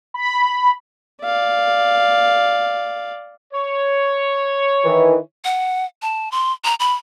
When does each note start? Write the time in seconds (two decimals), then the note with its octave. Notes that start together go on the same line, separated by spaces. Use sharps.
0.14 B5
1.23 D5 F5
3.53 C#5
4.84 D#3 E3
5.44 F#5
6.02 A5
6.32 C6
6.64 A#5
6.80 B5